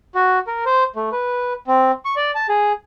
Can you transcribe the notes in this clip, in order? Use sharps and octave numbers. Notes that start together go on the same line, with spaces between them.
F#4
A#4
C5
A3
B4
C4
C#6
D5
A5
G#4